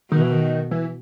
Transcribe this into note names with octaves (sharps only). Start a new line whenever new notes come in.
B2 D#3
E3
D#3
E3